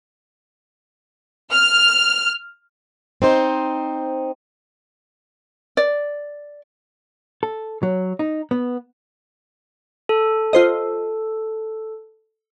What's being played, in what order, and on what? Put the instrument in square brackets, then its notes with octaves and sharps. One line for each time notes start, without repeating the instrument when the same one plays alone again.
[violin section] F6
[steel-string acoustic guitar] C4 D#4 C5
[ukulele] D5
[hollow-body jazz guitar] A4
F#3
D#4
B3
[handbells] A4
[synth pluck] F4 C5 D#5